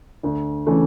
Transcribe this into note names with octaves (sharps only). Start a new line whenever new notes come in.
D2
C#3 E3 A3